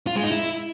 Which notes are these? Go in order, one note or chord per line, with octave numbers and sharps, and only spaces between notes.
F4
G#3
D#4
E4